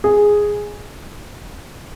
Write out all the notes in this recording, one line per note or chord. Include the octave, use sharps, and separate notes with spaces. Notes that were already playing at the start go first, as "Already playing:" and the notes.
G#4